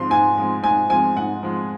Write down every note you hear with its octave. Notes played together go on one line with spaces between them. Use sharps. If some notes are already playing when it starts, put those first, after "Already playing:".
Already playing: G#2 F3 G#3 C6
G#2 G#5
F3 G#3
G#2 G#5
F3 G#3 G#5
G#2 F#5
F3 G#3